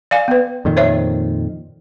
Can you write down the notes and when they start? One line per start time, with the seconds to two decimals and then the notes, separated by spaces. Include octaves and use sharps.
0.11 D5 F5 G#5
0.28 B3 B4
0.65 F2 A#2 D#3
0.77 C5 C#5 E5